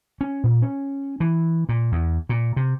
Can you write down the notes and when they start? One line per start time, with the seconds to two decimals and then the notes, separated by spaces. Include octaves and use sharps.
0.21 C#4
0.44 A#2
0.62 C#4
1.20 E3
1.69 A#2
1.92 E2
2.29 A#2
2.57 C3